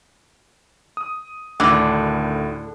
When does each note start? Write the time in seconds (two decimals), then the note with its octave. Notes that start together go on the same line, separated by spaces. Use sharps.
0.97 D#6
1.60 D2 A2 D3 D#3 F#6